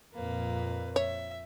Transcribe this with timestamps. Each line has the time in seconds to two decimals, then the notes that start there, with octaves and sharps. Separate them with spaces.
0.14 F2 A#2 A#3 B4
0.96 C#5 E5